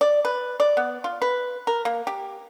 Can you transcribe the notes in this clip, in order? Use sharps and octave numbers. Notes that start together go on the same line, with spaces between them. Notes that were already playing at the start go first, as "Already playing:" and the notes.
D5
B4
D5
B3
F4
B4
A#4
A#3
G4